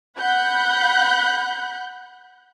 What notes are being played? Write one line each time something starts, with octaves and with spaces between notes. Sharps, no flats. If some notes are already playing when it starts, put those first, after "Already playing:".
F#5 B5 F#6 G6